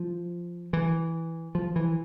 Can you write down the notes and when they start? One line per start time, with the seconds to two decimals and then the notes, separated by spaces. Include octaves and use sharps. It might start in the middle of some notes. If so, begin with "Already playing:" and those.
Already playing: F3
0.73 E3
1.55 F3
1.76 E3